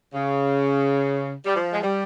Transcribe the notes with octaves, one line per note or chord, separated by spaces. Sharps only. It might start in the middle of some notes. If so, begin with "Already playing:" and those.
C#3
G3
F3
G#3
G3